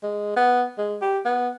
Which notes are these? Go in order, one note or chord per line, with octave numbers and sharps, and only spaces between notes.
G#3
B3
G#3
G4
B3